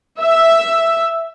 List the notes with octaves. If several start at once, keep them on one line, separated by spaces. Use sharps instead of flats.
E5